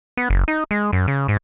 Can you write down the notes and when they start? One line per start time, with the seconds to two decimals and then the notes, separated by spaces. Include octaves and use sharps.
0.17 B3
0.30 F#1
0.48 D#4
0.71 G#3
0.93 F#2
1.08 C#3
1.28 G#2